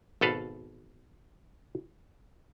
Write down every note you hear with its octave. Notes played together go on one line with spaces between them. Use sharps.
G#1 B2 A4 B4 F5